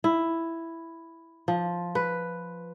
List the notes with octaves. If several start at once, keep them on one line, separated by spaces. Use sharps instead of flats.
E4
F3
B4